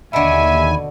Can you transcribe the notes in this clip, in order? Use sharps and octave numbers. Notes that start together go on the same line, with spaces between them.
D#2 B2 D3 E5 G#5 B5